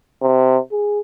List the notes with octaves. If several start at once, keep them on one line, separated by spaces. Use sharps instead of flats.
C3
G#4